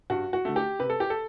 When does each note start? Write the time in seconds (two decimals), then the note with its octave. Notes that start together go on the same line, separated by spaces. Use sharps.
0.10 G2 F#4
0.33 F#4
0.45 D3 A3
0.56 G4
0.79 C3 B4
0.90 A4
1.00 G4
1.10 A4